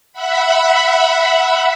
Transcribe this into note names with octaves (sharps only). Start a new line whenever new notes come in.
E5 F#5 B5